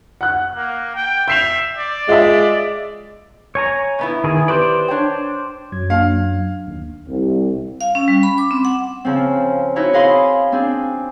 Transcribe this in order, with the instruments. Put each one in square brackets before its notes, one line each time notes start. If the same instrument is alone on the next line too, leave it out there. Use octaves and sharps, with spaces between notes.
[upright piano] F#5 F#6
[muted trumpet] A#3
G5
[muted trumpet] E5 [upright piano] G6 C7 F7
[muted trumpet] D5
[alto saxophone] G#3 [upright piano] F4 D#5 E5
[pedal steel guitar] C#5 G#5 A#5
[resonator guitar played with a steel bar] B2 B3 E4
[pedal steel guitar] D#3 G#4
[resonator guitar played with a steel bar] G4 B4 [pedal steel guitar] C5 D5
[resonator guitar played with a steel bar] D4 C#5 G5
[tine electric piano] F#2 F#3 G#6
[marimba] A#3 D4 [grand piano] F5
[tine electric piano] D#2
[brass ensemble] C2
[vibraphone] F5
C#4
G3
B5
D6
C4
F#5
[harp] C#3 F3 C4
D#4 E4 F#4 C#5
G#4 D#5 F5 B5 C6 D#6
C4 D4 G#4